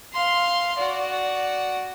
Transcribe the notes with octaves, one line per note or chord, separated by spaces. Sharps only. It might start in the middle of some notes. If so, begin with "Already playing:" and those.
F5 C6
F#4 D5